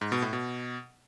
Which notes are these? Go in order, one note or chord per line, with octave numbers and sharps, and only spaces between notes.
G#2
B2
A2
B2